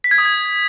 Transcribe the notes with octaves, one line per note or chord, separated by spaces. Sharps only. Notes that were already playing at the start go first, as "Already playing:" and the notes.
B6
G#6
D#6
G#6